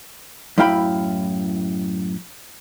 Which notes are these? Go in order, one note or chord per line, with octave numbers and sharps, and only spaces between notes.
F#2 A2 E4 F5 G5 B5